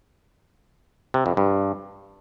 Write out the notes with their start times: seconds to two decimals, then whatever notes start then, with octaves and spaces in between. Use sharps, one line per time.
1.14 C3
1.26 F2
1.37 G2